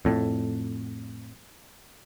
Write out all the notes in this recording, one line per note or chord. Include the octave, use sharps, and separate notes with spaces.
F2 A2